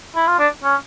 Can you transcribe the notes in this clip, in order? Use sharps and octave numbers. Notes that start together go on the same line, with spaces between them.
E4
F4
D4
C#4